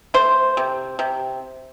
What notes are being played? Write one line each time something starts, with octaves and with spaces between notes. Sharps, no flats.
A3 C5
C3
C3